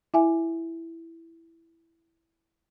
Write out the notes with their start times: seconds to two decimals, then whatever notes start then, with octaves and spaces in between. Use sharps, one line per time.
0.14 E4 E5 G#5